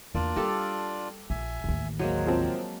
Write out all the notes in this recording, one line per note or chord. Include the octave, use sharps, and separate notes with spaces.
E2 A#3 D4 F4 D5
G3 G4 A4 F5
A#1 E5 G#5
A1 D#2
F#3 G#3 A#3 C5
F3 C4